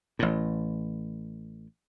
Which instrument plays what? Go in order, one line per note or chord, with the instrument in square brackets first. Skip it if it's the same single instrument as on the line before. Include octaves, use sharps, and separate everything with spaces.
[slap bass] A1 A2